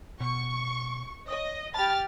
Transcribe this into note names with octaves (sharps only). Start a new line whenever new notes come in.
B2 C#6
C#5 D#5 D#6
G4 A5 B5 F6 A6